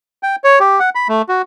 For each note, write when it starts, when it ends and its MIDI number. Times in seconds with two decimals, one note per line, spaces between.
0.23 0.36 79
0.44 0.59 73
0.60 0.79 67
0.80 0.90 78
0.95 1.08 83
1.09 1.22 57
1.29 1.42 66